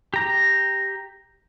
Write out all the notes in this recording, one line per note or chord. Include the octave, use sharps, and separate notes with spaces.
G4 A#5